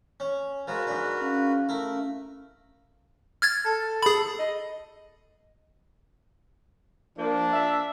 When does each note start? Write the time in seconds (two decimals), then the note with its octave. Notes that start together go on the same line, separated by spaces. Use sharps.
0.20 C#4
0.68 F3 G#3 F#4 A#4 B4
0.87 G#2 D4
1.21 C#4 F5
1.69 A3 E4 A#4
3.42 F6 G#6 A6
3.65 A4
4.02 G#4 B5
4.39 D#5
7.19 F3 A#3 D4
7.53 E5